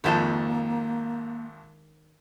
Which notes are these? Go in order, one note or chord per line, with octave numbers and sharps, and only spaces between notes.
G#1 F2 D#3 G#3 A#3 C5 A5